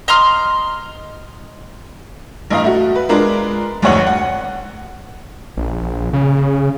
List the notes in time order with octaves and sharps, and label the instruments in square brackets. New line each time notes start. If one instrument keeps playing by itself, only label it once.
[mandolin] D#5 A#5 C6 F6
[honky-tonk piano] A1 G2 D#5 F5 A#5
A3 F#4
B4
G#3 D4 F4 A#4 B4
F1 D2 G#2 C#5 F#5 F#7
F#5
[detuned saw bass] A#1
C#3